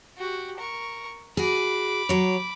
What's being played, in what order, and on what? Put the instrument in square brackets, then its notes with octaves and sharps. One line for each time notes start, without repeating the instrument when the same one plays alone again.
[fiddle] F#4 G4
A#4 C#6
[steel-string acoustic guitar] F#4 G#4 [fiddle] B5 D6
[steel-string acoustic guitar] F#3 C#5